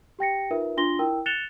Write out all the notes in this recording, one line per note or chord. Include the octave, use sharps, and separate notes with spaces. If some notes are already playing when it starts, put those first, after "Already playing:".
G4 G5 A#6 C#7
D#4 F4 A#4 B4 E5
D4 F4 C6 A#6 G7
E4 A#4 G5 E6
F#6 A6 C#7 E7 F7 G7